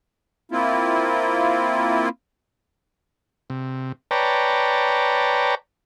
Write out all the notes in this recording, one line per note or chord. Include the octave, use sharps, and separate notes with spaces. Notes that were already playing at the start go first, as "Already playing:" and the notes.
A#3 C4 E4 F4
C3
B4 C#5 D5 G5 A5 A#5